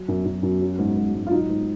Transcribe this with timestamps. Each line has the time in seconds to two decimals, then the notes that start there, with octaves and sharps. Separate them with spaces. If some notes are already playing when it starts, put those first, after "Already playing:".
Already playing: F#3
0.08 F#2
0.25 F#2
0.43 F#2
0.61 F#3
0.78 G#2
0.96 G#2
1.14 G#2
1.27 F4
1.31 F#3 D#4
1.50 G#2